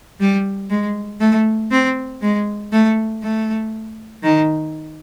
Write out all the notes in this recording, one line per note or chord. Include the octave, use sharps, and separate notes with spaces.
G3
G#3
A3
C4
G#3
A3
A3
D#3